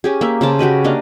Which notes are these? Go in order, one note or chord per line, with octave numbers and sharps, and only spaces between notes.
C#4 G4 G#4
A#3 E5
C#3 C5 A5
F#4 G4 B4 D#5
A#3 D4 D#5 F5